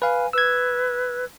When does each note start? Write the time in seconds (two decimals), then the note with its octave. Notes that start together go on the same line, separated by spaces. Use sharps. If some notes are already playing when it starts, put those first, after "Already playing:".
0.02 B4 F5 G#5
0.33 B4 E6 G#6